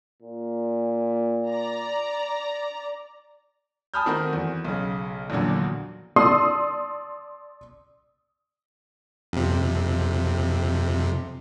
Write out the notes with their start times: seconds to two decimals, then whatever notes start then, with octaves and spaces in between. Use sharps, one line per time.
0.22 A#2
1.50 D5 A#5
3.94 G#5 A5 B5 D#6 F6 G6
4.06 D#3 A3 C4 D#4 F#4 A#4
4.33 E2
4.65 B1 C#3
5.30 A#1 E2 A#2 D3 F#3
6.16 D5 A5 C6 D#6 E6 C7
9.33 F2 C3